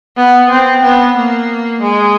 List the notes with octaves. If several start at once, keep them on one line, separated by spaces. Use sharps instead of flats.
B3
C4
B3
A#3
G#3